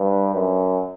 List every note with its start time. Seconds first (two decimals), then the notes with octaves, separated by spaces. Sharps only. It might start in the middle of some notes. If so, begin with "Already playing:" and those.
Already playing: G2
0.34 F#2